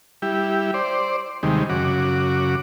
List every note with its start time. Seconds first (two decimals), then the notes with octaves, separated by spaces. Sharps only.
0.22 G3 E4 G4
0.74 C5 D5
1.43 D#2 C3 D#3 G3 G#3
1.69 F#2 C#3 F#4 D6